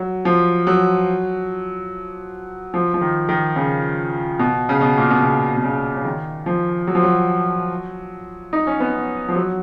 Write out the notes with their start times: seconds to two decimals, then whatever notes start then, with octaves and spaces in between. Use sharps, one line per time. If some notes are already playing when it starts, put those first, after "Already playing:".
Already playing: F#3
0.25 F3
0.67 F#3
2.74 F3
2.94 F3
3.01 D#3
3.29 D#3
3.56 C#3
4.39 B2
4.69 C#3
4.81 B2
4.98 A#2
5.10 B2
5.23 C#3
5.57 B2
5.63 C#3
5.97 C#3
6.05 D#3
6.46 F3
6.87 F#3
6.95 F3
7.03 F#3
8.53 D#4
8.67 C#4
8.80 B3
8.95 C#4
9.29 F3
9.36 F#3